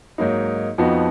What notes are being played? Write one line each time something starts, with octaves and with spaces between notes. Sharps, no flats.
G#2 F#3 A#3 D#4
F2 F3 B3 D#4 F#4